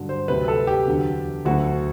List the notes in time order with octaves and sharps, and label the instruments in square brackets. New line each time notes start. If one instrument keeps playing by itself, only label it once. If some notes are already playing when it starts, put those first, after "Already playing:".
Already playing: [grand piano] G2 D3 F#3
C5
D2 C3 F#3 B4
A4
G4
E2 D3 F#3
D2 D3 F#3 F#4